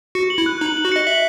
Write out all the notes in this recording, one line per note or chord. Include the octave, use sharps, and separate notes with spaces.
F#4 C#7
F#7
E4
F#6
D#4 F#7
F#7
F#4
D#5 C#7
E5 F#7